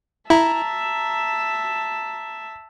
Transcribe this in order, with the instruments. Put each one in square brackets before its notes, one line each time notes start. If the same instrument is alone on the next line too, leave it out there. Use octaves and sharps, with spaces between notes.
[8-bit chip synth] E4 [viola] E5 A5 [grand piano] A#5